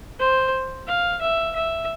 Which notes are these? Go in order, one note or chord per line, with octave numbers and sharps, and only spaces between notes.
C5
F5
E5
E5